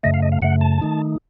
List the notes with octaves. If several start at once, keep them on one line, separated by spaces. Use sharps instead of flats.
F#2 C#3 A3 D#5
F5
D#5
F5
F#2 C#3 A3 F#5
A5
D#3 A3 D#4